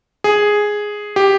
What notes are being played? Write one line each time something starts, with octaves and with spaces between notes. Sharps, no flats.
G#4
G4